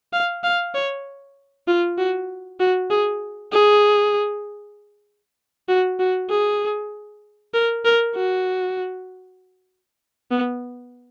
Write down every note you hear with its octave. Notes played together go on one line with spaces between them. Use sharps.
F5
F5
C#5
F4
F#4
F#4
G#4
G#4
F#4
F#4
G#4
A#4
A#4
F#4
B3